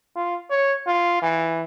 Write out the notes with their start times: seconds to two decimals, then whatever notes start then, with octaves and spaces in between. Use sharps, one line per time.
0.16 F4
0.50 C#5
0.87 F4
1.22 E3